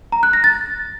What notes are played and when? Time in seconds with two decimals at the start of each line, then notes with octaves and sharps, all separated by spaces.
0.12 A#5
0.23 F#6
0.33 A#6
0.44 A6